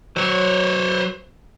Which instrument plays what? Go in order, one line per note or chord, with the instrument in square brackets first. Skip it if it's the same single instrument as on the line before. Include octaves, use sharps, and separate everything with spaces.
[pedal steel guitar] F#3 [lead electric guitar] C5 C#5